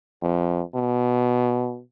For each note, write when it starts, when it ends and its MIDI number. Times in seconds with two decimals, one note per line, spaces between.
0.22 0.62 41
0.75 1.81 47